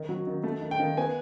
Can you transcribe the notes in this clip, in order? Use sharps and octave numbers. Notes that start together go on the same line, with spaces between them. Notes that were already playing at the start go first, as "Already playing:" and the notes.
Already playing: D#3
F#3
D#3
A3
D#3
G5
D#3
B3 G#5